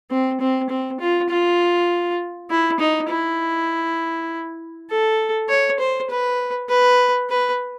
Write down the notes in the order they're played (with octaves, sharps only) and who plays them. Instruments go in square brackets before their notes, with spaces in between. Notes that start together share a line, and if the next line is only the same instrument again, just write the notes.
[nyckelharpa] C4
C4
C4
F4
F4
E4
D#4
E4
A4
C#5
C5
B4
B4
B4